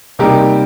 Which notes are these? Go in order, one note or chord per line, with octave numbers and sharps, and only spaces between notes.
C3 G3 A#3 D#4 G4 A#4